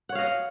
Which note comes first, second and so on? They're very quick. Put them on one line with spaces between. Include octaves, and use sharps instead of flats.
F#5 C#5 F5 D#5